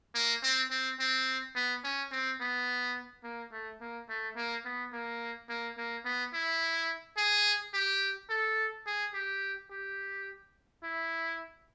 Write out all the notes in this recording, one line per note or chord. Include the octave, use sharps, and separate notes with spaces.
A#3
C4
C4
C4
B3
C#4
C4
B3
A#3
A3
A#3
A3
A#3
B3
A#3
A#3
A#3
B3
E4
G#4
G4
A4
G#4
G4
G4
E4